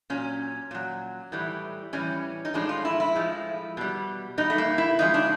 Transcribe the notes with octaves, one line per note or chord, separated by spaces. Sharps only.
A#2 F#3 C#4
A#2 F#3
A2 E3 G3
A2 E3 G3 C#4
D#4
A2 F3 G#3 D4
F4
E4
E4
A2 F3 G#3
B2 G3
B2 G3 D#4
A3
A#3
E4
C#3 F3 G#3 D#4
D4